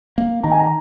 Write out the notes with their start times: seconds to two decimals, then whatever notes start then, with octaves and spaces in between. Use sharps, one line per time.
0.18 A#3
0.43 D#3 A#5
0.51 G#5
0.59 A#5